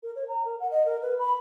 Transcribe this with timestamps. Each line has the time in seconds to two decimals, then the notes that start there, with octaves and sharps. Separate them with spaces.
0.03 A#4
0.16 C#5
0.28 A#5
0.45 A#4
0.60 F#5
0.71 D#5
0.86 A#4
1.02 B4
1.19 B5